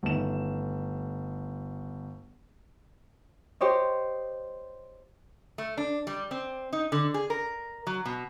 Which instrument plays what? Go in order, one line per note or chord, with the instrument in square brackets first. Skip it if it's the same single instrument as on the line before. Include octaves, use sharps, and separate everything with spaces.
[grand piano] G1 D#3 A3 E7
[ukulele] G4 C5 C#5 D#5
[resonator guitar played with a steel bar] A3
D4
G3
C4
D#4
D3
G#4
A#4
F#3
B2